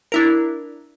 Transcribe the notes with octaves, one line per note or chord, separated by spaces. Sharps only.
D4 E4 A#4